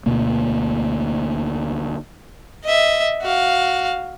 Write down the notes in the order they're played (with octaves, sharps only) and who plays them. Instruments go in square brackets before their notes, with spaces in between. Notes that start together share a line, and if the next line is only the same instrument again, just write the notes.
[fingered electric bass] D2 B2 A3 A#3
[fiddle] D#5 E5
F#4 F5